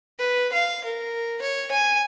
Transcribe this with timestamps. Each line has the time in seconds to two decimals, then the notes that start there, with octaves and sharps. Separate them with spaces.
0.19 B4
0.53 F5
0.84 A#4
1.42 C#5
1.72 G#5